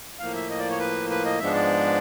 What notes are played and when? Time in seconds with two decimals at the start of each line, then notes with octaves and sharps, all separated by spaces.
0.19 A2 F3 A#3 F5
0.35 E5
0.50 D#5
0.59 D5
0.70 C#5
0.79 B4
1.10 B4
1.25 D#5
1.39 G#2 F3 G#3 B3 D4 E5
1.54 D5